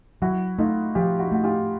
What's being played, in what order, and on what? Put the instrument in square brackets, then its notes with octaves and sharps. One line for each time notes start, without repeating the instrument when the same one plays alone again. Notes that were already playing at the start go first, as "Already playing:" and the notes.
[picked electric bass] F#3 [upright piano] E4 F#4
[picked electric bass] A3 [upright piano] D#4 F4
[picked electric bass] F3 [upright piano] F4 G4
[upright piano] E4 F#4
[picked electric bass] A3 [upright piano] F#4
[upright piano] F4 G4